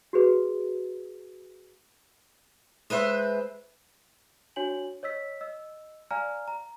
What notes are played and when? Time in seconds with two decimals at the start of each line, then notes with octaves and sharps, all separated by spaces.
0.13 F#4 G#4 B4
2.90 G#3 B4 C5 E5
4.56 D4 F#4 C#5 G#5 F#7
5.03 C#5 D#5 E6 B6
5.41 D#5 E6
6.11 D5 F5 G#5 A#5 F6
6.48 A#5